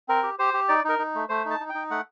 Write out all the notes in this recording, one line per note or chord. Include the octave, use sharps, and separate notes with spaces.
C4 A#4
G4
G4 C5
G4
D#4 D5
D#4 A#4
D#4
A3
A3 C5
D#4
A5
D#4
G5
D#4
A3 F#5